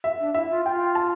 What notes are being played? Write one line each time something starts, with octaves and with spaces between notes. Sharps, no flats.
E5
D4
E4 E5
F4
F4 G5
A5